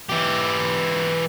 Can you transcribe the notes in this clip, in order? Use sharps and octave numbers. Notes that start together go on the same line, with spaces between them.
E3 G4